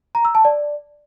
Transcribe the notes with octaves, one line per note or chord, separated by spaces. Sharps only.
A#5
E6
A5
D5